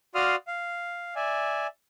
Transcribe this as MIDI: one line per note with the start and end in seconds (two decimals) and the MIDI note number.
0.15 0.36 66
0.15 0.36 74
0.15 0.36 77
0.15 0.36 84
0.15 0.36 87
0.15 0.36 89
0.47 1.14 77
1.16 1.67 74
1.16 1.67 76
1.16 1.67 80